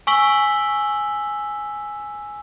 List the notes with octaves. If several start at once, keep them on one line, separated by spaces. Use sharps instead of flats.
G#5 C#6 E6 B6 F#7 G7